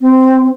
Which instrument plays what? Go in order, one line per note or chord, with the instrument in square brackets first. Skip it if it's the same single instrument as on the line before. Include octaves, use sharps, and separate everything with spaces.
[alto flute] C4